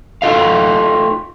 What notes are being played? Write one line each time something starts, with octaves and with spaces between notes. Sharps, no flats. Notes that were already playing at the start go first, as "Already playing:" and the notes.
D#4 F4 A4 D#5 F5